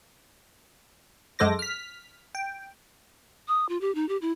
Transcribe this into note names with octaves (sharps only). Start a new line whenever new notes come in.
F#2 G#3 A4 C5 D6 A#6
F6 B6
G5
D#6
F4
G4
D#4
G4
E4